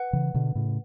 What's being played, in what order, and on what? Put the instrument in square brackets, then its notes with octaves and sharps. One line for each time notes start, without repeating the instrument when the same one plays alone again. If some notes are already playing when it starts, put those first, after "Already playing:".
Already playing: [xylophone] B4 F#5
[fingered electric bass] C#3 E3
B2 D3
A2 C#3